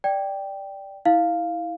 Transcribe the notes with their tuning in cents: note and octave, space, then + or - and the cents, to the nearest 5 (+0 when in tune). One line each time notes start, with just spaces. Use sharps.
D5 +0 G5 +0
E4 -25 F5 +0